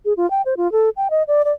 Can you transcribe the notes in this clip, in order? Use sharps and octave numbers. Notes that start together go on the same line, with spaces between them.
G#4
F4
G5
C5
F4
A4
G5
D#5
D5
D5